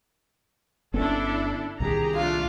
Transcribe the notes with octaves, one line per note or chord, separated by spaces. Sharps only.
G1 B3 C#4 D4 E4 A4
C2 A#2 D#3 G4 G#4 A#5
A3 D4 F4